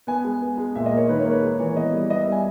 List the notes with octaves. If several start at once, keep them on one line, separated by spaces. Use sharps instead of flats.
B3 G#5
G#3
B3
G#3
A#2 E5
D#5
A#3
C#5
D#3 B4
C#5
A#3
B4
G#3
E3 C#5
B3 D#5
G3
B3 D#5
E5
G3
G#5